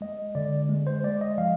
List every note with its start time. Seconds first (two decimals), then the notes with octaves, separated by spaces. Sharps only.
0.01 G#3 D#5
0.35 D3 D5
0.69 G#3
0.87 C5
1.04 G#3 D5
1.21 D#5
1.38 F3 F5